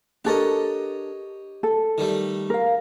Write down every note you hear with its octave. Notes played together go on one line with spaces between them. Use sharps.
D4 G4 A4 A#4 C#5 D#5
A4
D#3 G3 A3
A#4 F5